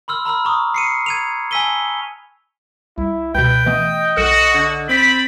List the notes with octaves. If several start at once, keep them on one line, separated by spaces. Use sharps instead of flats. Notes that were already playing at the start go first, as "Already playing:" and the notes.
B5 C6 E6 F6
A#5 B5 E6 F6
A#5 C#6 D#6
C7 C#7 D#7
G#6 D#7 F7
G#5 A5 E6 B6 D#7 G7
C2 E4
C#2 B2 B4 G5
E3 A3 B3 D#5
B1 F#4 A4 F6
D3
C4 D5 B5